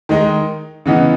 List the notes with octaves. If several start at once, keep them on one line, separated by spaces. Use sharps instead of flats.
D#3 G#3 D#4
C#3 E3 B3 D#4